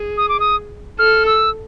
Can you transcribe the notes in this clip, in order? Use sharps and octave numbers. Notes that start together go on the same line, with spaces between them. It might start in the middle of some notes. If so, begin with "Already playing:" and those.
Already playing: G#4
D#6
D6
D#6
A4 F6
E6